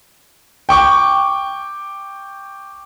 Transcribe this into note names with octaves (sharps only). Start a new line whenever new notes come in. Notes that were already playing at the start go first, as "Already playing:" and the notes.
G5 C#6 D6